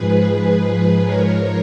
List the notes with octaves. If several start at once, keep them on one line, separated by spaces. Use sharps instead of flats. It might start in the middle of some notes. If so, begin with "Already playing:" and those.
Already playing: G#2 F3 G#4 B4
G#2 F3 A#4 C#5